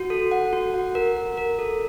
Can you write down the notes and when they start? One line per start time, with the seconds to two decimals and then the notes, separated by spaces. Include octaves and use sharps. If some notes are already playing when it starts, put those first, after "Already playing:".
Already playing: F#4
0.10 A4
0.31 F#5
0.53 F#4
0.74 F#5
0.95 A#4
1.17 A#4
1.37 A#4
1.59 A4